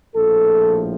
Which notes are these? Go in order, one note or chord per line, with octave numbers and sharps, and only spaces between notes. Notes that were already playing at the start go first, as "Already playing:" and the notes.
A#1 A2 F3 A4